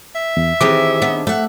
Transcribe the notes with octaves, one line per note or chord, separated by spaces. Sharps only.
E5
E2
D#3 E3 C4 G4 G#4 D6
B3 D4
A3 E5 F#5